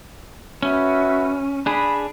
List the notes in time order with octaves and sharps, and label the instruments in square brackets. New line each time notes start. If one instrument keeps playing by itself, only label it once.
[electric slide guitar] C#4 [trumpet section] F#4 B4 E5
[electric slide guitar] D4 G#4 [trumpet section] B5